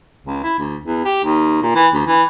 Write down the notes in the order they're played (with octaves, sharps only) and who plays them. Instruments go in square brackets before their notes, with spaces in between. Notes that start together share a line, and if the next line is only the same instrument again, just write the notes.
[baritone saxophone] C#2
E4
D2
E2
G4
D#2
A#2
E3
D2
E3